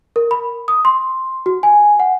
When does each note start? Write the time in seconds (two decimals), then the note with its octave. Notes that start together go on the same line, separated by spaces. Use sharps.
0.16 A#4
0.31 B5
0.68 D#6
0.85 C6
1.46 F#4
1.63 G#5
2.00 F#5